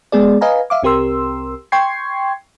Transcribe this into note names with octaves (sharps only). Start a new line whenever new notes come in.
G#3 B3 G#4 D5
B4 D#5 F5 G#5 A#5
E5 F5 D6
C2 C4 G4 A#4 C6 E6
G5 C6 C#6 G#6 C7